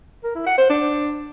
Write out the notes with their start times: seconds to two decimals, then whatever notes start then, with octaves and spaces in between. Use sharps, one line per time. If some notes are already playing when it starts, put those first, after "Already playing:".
0.24 A#4
0.35 E4
0.47 F#5
0.58 C5
0.70 D4